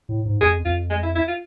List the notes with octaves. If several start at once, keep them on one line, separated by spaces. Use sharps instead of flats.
A2
G#2
F2 G#4
F2 F4
G#3
E4
E4
F4